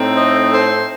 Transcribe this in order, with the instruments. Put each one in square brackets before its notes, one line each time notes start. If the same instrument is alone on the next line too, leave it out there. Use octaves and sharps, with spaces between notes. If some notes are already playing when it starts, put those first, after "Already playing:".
Already playing: [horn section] A2 A3 C4 D#4
C5 D#5
A4 C5